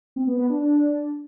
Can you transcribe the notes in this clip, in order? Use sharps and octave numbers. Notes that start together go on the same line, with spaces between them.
C4
B3
B3
D4
D4